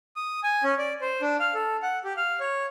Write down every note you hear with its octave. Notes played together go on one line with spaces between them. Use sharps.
D#6
G#5
C#4
D5
C5
D4
F5
A4
F#5
G4
F5
C#5